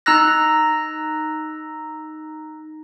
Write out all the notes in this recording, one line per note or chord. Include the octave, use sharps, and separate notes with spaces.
D#4 A#5 E6 F#6 A#6